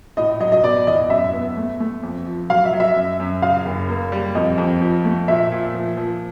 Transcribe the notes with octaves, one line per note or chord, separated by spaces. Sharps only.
A2 D#5
F#3 D#5
D#5
B2 D5
E2 D#5
F#2 E5
B3
A3
A3
F2
F3
F#3 F5
E5
F#3
E5
F#2
F#2
C#3 F5
F#1
A#3
G3
F2 D#5
F2
F3
A3
A#2 E5
A#2
F3
F3